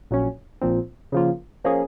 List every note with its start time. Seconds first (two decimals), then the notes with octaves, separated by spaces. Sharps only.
0.11 A#1 A#2 F#3 C#4
0.61 A#1 A#2 F3 C4
1.12 C#3 F3 A#3 F4
1.64 F3 A#3 C#4 G#4